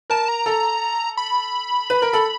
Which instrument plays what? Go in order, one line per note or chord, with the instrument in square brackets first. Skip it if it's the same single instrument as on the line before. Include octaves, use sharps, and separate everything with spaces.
[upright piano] A#4 [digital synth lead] A5
[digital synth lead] A#5
[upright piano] A4
[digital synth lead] B5
[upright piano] B4
A#4
A4